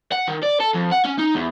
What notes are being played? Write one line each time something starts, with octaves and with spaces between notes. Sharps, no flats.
F#5
D#3
D5
A4
F2
F#5
C#4
D#4
E2